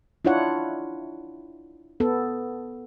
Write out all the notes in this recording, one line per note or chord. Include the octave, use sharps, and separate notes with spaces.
D4 E4 F4 C#5 F#5
B3 A4